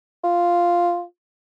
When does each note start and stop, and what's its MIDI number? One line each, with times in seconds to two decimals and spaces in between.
0.24 1.03 65